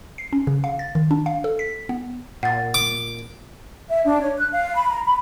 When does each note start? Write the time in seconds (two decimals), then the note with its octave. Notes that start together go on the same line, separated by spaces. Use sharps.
0.18 C7
0.33 C#4
0.47 C#3
0.64 F5
0.79 A6
0.95 D#3
1.11 D4
1.26 F5
1.44 A4
1.59 B6
1.89 B3
2.43 A#2 F#5 A6
2.74 D6
3.90 E5
4.05 D4
4.21 C#5
4.38 F#6
4.52 F5
4.75 B5
4.91 A#5
5.04 B5